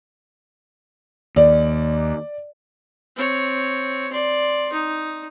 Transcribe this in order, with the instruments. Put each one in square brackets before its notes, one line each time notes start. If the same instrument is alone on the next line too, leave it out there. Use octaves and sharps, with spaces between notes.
[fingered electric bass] D#2 [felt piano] D5
[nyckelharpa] C4 C#5
D5 C6
D#4